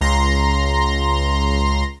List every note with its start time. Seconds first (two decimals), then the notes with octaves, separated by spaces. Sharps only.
0.01 C#2 A#5 C6 A#6